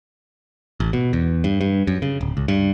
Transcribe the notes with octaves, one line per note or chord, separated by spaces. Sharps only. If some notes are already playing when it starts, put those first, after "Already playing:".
A1
B2
E2
G2
G2
F#2
C#3
D1
C#2
G2